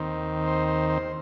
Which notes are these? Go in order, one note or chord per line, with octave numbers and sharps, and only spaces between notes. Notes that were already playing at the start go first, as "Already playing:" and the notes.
Already playing: D#2 D#3 C4
C5
C5
C5